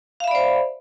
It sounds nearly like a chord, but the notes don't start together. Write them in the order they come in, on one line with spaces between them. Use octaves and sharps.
F5 E5 B5 D5 C5